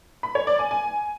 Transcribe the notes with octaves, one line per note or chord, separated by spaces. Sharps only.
B5
C#5
D5
G#5
G#5